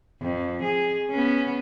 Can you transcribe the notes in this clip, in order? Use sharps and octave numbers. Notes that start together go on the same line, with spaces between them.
F2
G#4
B3 C#4